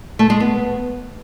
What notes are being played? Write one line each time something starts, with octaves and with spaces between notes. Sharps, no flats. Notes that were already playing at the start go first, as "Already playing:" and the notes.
A3
G#3
B3